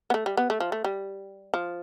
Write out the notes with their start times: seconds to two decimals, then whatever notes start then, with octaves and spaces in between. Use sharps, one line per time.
0.10 B3
0.14 A3
0.26 G3
0.37 B3
0.50 A3
0.60 F3
0.72 A3
0.84 G3
1.54 F3